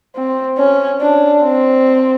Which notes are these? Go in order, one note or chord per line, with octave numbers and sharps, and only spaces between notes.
C4
C#4
D4
C4